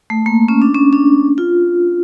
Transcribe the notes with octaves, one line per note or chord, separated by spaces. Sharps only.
A3
A#3
C#4
D4
C#4
D4
F4